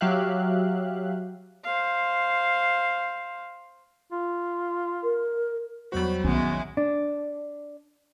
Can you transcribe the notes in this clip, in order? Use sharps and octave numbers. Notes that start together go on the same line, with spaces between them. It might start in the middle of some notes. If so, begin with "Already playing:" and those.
F#3 G4 E5 F5 F#6
C5 F5
F4
A#4
E2 F#3 G3 F#4 C5 B5
A#1 D#3 G#3 B3 C#4 E4
D4